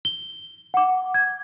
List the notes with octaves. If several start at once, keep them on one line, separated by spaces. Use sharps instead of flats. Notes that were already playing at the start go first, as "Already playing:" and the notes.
G7
F#5 D6
G#6